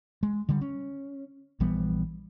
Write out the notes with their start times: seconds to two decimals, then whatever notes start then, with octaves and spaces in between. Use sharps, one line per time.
0.23 G#3
0.49 D3 G3
0.61 C#4
1.60 A#1 E3 G3 B3